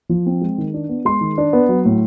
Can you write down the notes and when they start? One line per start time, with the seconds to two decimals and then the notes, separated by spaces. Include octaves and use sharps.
0.09 F3
0.26 C4
0.41 G#3
0.58 D#3
0.74 D4
0.89 B3
1.05 G#3 C6
1.21 D#3
1.38 D4
1.53 B3
1.69 F#3
1.85 A2